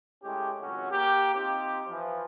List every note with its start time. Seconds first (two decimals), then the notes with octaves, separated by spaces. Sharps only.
0.23 A2 G#3 C#4 G4
0.61 G#1 C#2 F#3 C#4 F#4
0.92 A#3 G4
1.35 C4 D#4 F4 G4
1.88 E3 F3